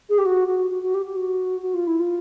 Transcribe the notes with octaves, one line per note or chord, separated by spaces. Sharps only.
G#4
G4
F#4
F#4
F#4
F#4
G4
G4
F#4
F#4
F4
E4
F4